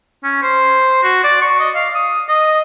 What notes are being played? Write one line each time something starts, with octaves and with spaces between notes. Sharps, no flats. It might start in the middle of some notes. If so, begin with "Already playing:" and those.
C#4
C5
F#4
D5
C#6
D#5
F5
D#6
D#5